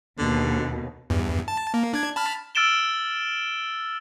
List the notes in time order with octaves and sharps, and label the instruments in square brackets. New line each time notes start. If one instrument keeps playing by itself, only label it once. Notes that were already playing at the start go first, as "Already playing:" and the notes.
[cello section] D#2 B2 [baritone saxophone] D3
[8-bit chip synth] E2 G2
A5
A#3
D4 G#6
A5 B5 F6
[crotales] E6 F6 A6 D7 E7 G7